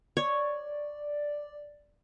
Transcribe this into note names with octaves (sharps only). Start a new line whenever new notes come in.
C#5 D5